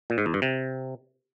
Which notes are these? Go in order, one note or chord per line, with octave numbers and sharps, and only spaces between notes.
A#2
G#2
E2
G2
C3